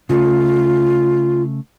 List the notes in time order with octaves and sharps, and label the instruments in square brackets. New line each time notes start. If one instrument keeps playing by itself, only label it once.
[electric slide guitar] C#3 A3 [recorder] F4